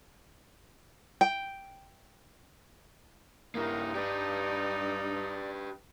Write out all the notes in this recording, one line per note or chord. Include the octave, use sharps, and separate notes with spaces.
G5
G2 A#3 D#4 E4 A#4
G4 B4 D5